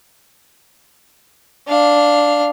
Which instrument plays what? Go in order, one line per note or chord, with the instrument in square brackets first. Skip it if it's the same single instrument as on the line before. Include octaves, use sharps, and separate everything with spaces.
[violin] D4 F5